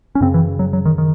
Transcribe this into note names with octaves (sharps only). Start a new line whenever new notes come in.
C#4
F#2 C#3 C4
E3
F#3
F#3
D#3
D#3